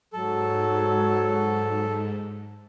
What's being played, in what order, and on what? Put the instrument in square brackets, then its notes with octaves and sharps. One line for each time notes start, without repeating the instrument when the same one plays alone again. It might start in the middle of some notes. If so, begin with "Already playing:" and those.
[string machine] G#2 [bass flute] F#3 [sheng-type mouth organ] A4